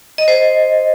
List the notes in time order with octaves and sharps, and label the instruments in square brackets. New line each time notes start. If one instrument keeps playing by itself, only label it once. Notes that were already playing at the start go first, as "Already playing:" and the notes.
[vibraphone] D#5
C5